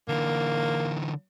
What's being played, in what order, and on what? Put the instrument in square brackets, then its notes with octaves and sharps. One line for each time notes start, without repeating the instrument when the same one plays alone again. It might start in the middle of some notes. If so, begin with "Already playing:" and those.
[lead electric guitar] D3 E3 [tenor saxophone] A#3